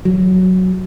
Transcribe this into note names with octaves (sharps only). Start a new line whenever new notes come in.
F#3